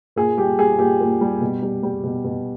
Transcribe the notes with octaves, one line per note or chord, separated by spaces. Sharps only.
A#2 G#4
G3 G4
G3 G#4
A#2 G4
A#2
G3
B2
G3
G3
B2
B2